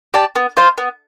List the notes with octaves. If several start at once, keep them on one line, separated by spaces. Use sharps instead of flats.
G4 D5 A5
B3
F4 C5 F5
B3